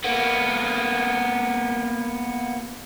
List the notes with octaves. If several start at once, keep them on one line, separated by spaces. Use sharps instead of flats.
A#3 B3